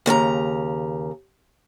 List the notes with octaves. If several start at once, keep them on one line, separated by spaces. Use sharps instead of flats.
D#2 C#3 B4 A#5